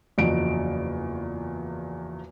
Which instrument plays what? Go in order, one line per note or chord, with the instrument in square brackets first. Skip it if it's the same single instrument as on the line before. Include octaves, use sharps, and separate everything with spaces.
[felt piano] F#1 E2 F3 F#4 D7